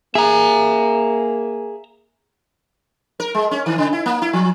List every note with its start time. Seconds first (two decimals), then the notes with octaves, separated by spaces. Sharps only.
0.15 A#3 G#4 E5 A#5
3.20 A#4
3.35 G#3
3.51 C#4
3.66 D#3
3.78 C#3
3.93 E4
4.06 A#3
4.22 E4
4.33 F3